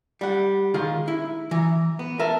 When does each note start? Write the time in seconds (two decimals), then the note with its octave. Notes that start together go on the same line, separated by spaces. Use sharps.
0.21 G3 F#5
0.74 D#3 G#3 F4 G#4
1.08 E4
1.51 E3 A#5
1.99 B3
2.19 A#4 E5 A5